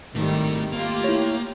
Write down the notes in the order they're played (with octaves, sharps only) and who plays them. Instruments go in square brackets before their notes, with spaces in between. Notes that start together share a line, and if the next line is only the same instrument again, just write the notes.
[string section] G#1 D#3 G3 [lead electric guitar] A2 A3
[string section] A3 F4 G4 [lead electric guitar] A#3
[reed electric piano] E4 C#5